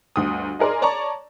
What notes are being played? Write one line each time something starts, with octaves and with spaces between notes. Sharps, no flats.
G1 D2 D#6
D#4 G#4 A#4 D5 C6
C#5 D5 A5 A#5 C#6